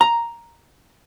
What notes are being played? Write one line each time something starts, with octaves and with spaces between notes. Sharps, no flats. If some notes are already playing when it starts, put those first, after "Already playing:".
A#5